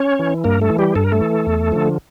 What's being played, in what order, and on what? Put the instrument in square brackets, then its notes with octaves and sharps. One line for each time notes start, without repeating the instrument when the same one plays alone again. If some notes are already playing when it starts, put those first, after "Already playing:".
Already playing: [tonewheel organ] C#4 C#5
E3
G2 A#3 A#4
A3 A4
E3
G3 G4
G2 A4
A#4
A3 A4
E3
E2
D3 F3